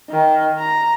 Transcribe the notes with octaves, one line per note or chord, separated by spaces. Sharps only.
D#3
A#5